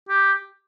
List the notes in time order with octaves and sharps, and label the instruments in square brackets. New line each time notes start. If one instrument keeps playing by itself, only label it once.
[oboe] G4